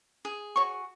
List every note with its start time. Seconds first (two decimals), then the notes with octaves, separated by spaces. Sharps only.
0.25 G#4
0.56 F#4 C#5 C#6